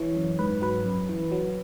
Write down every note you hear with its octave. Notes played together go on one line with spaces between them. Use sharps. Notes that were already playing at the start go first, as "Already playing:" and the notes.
Already playing: E3 C#5
F#2
G#2 B4
F#3 B4
F#2
E3
F#3